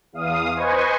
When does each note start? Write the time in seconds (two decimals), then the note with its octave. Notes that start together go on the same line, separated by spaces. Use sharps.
0.13 E2 F5 D#6
0.55 B4 C5 D#5 G#5 C#6